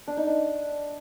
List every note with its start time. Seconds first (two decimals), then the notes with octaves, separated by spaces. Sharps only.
0.07 D4
0.17 D#4
0.27 D4